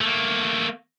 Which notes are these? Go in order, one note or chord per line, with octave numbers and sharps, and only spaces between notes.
A3 A#3